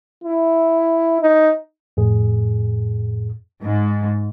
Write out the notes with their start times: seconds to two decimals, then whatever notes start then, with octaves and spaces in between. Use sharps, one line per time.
0.24 E4
1.21 D#4
1.97 F2 A2 G#4
3.62 G#2